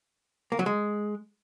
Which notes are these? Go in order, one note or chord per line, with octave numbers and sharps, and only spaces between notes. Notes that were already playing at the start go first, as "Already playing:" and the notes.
A#3
F#3
G#3